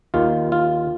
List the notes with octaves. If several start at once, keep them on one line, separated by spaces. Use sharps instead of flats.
D#2 D#3 F4
F4